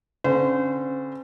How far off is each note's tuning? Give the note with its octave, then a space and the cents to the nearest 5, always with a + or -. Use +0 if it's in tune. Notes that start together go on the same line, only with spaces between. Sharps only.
D3 -25 C#4 -40 C5 -30